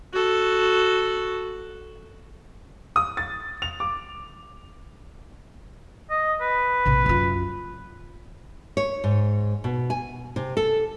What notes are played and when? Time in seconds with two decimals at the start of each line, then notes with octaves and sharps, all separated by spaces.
0.13 F#4 A4
2.96 D#6
3.17 A6
3.62 F7
3.80 D6
6.10 D#5
6.41 B4
6.86 A#1 C3
7.06 F#2 F4
8.77 C#5
9.04 G#2
9.64 B2
9.90 G#5
10.36 C3
10.57 A4